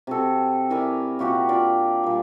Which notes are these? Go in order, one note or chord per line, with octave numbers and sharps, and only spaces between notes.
C3 F#4 A4
E4 A#4 D5 G#5
A#2 F#4 G4 F#5
D4 F4 D5
A#2 G3